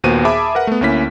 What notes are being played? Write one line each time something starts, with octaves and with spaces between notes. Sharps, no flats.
D#2 A#2 B3 F#4 C5 D#7
G#4 E5 A5 B5 D6
A#4 B4 F#5
A3 B3
D2 A#3 C#4 E4 B6